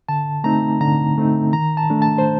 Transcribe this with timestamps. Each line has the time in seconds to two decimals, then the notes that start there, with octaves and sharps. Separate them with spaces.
0.09 D3 A5
0.44 A3 C4 D#4 A#5
0.81 D3 A#5
1.18 A3 C4 D#4
1.53 D#3 A#5
1.77 A5
1.90 A3 D4
2.02 A5
2.18 C5